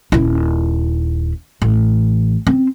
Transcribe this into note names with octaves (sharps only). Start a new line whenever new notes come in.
D#1 E4
A1
C4